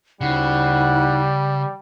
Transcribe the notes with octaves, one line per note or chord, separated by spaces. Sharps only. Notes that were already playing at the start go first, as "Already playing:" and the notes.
D2 C#3 G3 D#4 E4 F#5